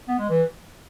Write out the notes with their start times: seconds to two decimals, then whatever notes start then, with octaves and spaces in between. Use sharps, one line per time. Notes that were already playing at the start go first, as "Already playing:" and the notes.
0.08 B3
0.19 G#3
0.29 E3